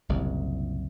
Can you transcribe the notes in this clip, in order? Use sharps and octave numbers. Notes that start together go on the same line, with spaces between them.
F#1 C2 A#2